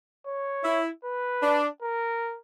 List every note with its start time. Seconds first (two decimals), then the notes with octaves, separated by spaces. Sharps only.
0.26 C#5
0.64 E4
1.04 B4
1.43 D4
1.82 A#4